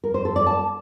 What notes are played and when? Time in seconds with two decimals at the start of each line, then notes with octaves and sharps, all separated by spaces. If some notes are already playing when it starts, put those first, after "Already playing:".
0.04 A#4
0.14 C5
0.25 A4
0.36 D5
0.47 A5